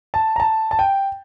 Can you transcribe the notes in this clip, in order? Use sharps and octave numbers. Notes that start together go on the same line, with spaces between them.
A5
A#5
A5
A5
G5